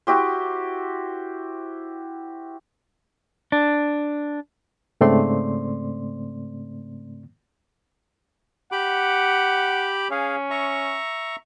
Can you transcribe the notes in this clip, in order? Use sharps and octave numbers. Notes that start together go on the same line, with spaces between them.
E4 F#4 G4 C5
D4
G#2 C#3 A3 C4 D5 C6
G4 F#5 B5 D6
C#4 G#4 F5
E5 A#5 C#6